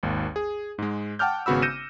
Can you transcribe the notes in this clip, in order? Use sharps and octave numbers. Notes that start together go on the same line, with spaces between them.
G#1 D#2
G#4
G#2 G#3
F#5 G5 A5 D6 F6 G6
G#1 C#3 B3 F#4 B5 E6
G6 A#6 C#7 D#7 E7